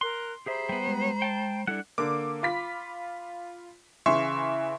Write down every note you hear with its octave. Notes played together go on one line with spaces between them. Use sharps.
A#4 C6 F#6
G4 G#4 C5 E5 A#5 B5
G3 B3
G#3
G5 A5
G3 D4 E4 A4 F#5
D3 A#3 D6
F4 B5 B6
C#3 E3 E5 C6 C#6